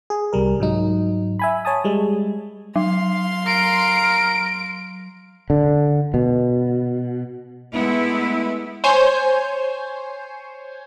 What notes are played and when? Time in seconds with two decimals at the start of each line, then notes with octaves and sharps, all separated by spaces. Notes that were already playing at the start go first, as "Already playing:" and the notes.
0.10 G#4
0.33 C2 G3 A#4
0.60 G#2 F#3 D#4
1.39 E5 G#5 B5
1.65 C#5 G#5 A5 D#6
1.84 G3 G#3
2.76 F#3 F5 C6
3.47 A#4 D7
5.50 D3
6.14 B2
7.74 G#3 A3 B3 E4
8.84 C5 C#5 G#5 G6